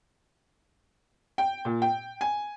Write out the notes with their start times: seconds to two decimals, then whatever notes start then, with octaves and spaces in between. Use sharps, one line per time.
1.38 G5
1.65 A#2
1.82 G5
2.21 G#5